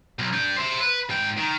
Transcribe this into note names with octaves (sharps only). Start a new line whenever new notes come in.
B1
D4 G5
C5 E5
B4
G#2 G5
D#3